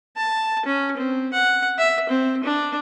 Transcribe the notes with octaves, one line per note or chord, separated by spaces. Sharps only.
A5
C#4
C4
F#5
E5
C4
D4